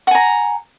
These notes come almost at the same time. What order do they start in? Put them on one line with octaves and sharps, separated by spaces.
F#5 G#5 A#5